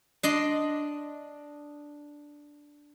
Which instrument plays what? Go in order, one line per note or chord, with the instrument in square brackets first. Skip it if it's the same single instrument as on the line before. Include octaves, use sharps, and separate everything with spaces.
[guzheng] D4 D#5 C6